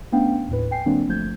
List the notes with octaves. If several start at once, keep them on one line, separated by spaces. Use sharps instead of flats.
A3 B3 C#4 D4 F5 G5
D#2 A2 B4
G5 G#5 C7
D3 F#3 A#3 C4 D4
G1 F3 A3 G6 G#6